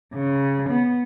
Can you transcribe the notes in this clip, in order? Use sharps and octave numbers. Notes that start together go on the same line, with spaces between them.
C#3
B3